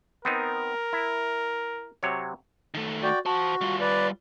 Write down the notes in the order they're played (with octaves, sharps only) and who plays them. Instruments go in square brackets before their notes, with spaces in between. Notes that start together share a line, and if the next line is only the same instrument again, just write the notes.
[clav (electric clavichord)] B3 C4 D#4 [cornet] A#4
[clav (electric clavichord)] E4
C3 F#3 C#5
[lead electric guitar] D#3 A3
[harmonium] F#4 D5 G5
[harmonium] F#4 [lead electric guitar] C5 A5
[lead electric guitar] G3 F4
[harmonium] B4 D5